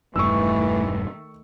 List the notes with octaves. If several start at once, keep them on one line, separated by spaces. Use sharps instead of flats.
E1 G2 D#3 E3 A3 C#6 E6